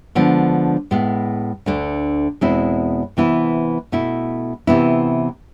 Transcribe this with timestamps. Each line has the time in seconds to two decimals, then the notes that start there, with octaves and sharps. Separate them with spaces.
0.15 D3 F3 G#3 B3
0.91 A2 G#3 B3
1.66 D2 D3 A3 D4
2.41 E2 B2 G#3 C4 E4
3.17 C3 E3 B3 E4
3.92 B2 A3 E4
4.67 C3 E3 B3 E4